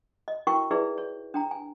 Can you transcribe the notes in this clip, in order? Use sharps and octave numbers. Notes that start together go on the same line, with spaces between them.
D#5
E4 F#4 A#4 G5 C#6
D#4 E4 G#4 B4 D5 E5
C#5
D4 G5 A#5
G#5